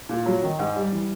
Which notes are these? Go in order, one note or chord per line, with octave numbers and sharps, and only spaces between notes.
A#2
F#3
D#3
G#2
G3
E3